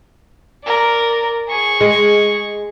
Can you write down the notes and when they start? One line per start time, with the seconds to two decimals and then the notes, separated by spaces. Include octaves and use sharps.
0.64 A#4 D5
1.48 G#4 C#6
1.81 G#3